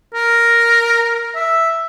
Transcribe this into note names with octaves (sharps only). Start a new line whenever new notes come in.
A#4
E5